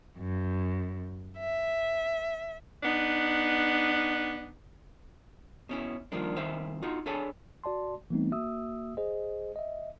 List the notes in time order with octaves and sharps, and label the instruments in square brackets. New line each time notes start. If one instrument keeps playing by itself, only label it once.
[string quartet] F#2
E5
[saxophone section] B3 D4 D#4
[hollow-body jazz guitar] B2 C#4 E4
D#3 F3 G3 A#3 D4
C2 D#3 C5 E5 F5
D#4 F4 F#4
D4 G#4 A4 C#5 G#5 B5
[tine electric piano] F#4 D5 A5 C6
E3 G3 A3 B3 C4 D#4
A#3 F#4 E5 D#6 E6
G#4 C5 D#5
D#5 E5